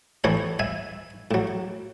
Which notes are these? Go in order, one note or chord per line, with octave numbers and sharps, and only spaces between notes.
A2 E3 A4 C#5
E5 G#5
A2 F#3